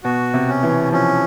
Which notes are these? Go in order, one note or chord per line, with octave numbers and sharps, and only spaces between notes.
B2 F#4
C3
C#4
E3
F3 C#4